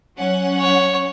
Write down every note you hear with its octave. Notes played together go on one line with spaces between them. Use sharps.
F#3 C#4 F#5
C#5